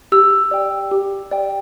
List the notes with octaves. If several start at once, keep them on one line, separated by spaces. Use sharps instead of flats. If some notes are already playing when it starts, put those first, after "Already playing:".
G4 E6
D5 G5
G4
D5 G5